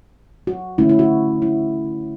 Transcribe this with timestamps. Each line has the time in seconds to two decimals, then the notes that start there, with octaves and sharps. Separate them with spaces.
0.47 F#4
0.78 D3 A3 C#4 E4
0.89 E4
0.99 F#4
1.42 E4